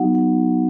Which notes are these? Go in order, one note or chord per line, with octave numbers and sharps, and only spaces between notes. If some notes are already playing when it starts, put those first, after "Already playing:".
Already playing: F#3 B3 D#4 F#4 F#5
F#5